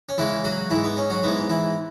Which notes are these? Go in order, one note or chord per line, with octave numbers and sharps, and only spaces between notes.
C#4
E2 C#3 E3 G#3 E4
F#3 F#4
G#2 E3 G#3 E4
B3
C#4
F#3 F#4
G#2 E3 G#3 B3
E3 E4